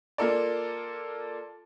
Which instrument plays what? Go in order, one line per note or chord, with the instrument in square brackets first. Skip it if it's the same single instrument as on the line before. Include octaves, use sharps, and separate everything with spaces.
[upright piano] A#3 F4 A4 D5